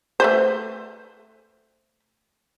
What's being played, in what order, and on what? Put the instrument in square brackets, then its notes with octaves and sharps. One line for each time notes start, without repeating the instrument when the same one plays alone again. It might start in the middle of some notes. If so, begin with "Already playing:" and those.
[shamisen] A3 B4 C5